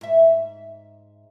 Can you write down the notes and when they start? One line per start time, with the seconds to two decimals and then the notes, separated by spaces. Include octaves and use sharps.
0.01 G#2 E5